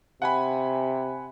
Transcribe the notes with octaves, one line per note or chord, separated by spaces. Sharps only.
C3 F#5 G#5 B5